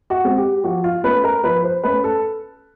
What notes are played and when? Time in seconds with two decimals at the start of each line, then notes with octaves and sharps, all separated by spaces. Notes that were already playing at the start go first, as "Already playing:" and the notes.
0.10 F#4
0.24 G#3 C4
0.37 G4
0.64 F3 F#4
0.84 F4
1.04 A3 C#4 B4
1.24 A#4
1.44 F3 B4
1.63 C5
1.84 A3 C#4 B4
2.04 A4